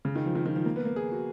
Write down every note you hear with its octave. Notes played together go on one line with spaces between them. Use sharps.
C#3
D#3
F3
D#3
D#3
F3
A#3
B3
A#3
G#4
F#4